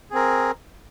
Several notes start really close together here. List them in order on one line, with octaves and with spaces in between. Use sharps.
G#4 C4 A#4